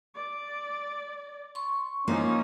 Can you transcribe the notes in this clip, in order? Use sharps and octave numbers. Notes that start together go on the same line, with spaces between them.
D5
C6 C#6
F3 A#3 C#4 D#4